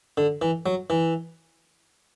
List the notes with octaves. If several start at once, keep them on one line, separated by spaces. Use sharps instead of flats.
D3
E3
F#3
E3